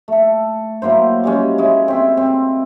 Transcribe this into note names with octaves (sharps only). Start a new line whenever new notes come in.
A3 A4
F#3 A#3 E4 C5
G3 G#3 C#4
G#3 C#4 E4
C4 E5
C4